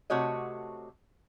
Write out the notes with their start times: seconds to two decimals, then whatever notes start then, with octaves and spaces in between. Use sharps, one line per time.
0.10 C3 A3 F#4 C#5 D#5